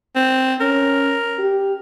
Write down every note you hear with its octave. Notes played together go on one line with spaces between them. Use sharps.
C4
C#4 A#4
G4